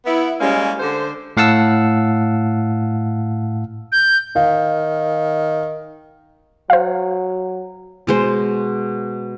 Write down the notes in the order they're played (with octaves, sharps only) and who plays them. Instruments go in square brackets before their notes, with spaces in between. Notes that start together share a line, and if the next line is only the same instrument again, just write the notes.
[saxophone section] B3 E4
G3 G#3 A#3 C#4
D3 C5
[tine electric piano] A2 F5 F#5 A5 E6
[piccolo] G6
[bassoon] D#3 [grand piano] F5
[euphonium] F#3 [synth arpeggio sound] C5 F5
[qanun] B2 G#3 C5